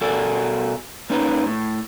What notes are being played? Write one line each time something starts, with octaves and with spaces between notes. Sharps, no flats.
B2 F#4 A4 A#4 D5 G#5
A#3 C#4 D#4 B4
A2